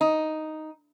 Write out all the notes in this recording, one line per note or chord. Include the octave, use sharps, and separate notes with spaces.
D#4